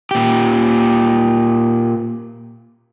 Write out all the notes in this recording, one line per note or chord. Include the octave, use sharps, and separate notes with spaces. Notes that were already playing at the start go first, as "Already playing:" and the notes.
A#2 G4